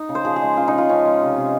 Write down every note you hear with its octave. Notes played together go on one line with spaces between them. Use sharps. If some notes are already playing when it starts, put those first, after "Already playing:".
Already playing: D#4
C#3
C5
F3 G#4
G#4
G#3
C#3 F4
D#4
C#3 F4
F3 C#4
G#3
C3
C3